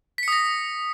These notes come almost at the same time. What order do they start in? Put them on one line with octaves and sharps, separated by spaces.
B6 C#7 D#6 A#6